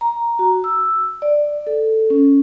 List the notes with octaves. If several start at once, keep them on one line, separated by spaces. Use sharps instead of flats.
A#5
F#4
E6
D5
A4
C#4